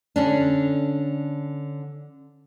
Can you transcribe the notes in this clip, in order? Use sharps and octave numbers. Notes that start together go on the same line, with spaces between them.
D3 C#4 D4